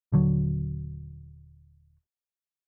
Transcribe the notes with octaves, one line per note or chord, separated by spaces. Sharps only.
D#1 D3 F#3